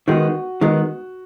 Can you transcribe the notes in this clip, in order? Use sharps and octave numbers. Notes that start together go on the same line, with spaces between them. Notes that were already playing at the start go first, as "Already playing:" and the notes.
D#3 G#3 B3 F#4
D#3 G#3 B3